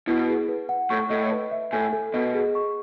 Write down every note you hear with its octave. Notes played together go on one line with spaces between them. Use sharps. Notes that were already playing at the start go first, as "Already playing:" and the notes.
B2 E4
G#4
B4
F#5
A2 C#6
A2 D#5
B4
E5
A2 G#5
A4
B2 D#5
G#4
C#6